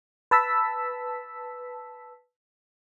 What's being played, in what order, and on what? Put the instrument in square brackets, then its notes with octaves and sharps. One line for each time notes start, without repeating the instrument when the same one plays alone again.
[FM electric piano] B4 A5 E6 B6